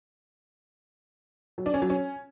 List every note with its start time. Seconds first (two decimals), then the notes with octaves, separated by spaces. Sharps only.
1.58 F#3
1.66 D4
1.74 C#4
1.82 F#3
1.90 C#4